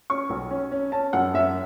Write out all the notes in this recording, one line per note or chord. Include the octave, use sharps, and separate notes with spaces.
C#4 C#6
B1
C#4
C#4
C#4 A5
F#2 F#5
F#2 E5